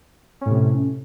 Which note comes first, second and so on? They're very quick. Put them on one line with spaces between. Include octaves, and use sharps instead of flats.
C#4 A2 C3